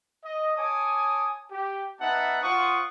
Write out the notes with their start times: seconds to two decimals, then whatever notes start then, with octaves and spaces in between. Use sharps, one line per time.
0.25 D#5
0.57 C#5 G#5 A5 D6 D#6
1.51 G4
2.01 B3 D#4 E5 F#5 A5
2.42 F4 C5 F#5 C#6 D#6